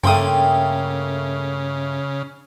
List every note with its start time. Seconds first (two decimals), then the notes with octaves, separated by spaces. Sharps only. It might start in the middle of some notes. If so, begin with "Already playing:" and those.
0.04 G2 C#3 A3 A#3 G5 C6 D#6